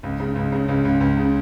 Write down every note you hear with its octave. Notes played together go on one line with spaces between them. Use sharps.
C#2
C#3
C#2
C#3
C#2
C#2
C#2
C#3